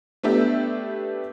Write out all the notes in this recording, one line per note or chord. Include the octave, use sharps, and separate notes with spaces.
A3 B3 D4 G4 E5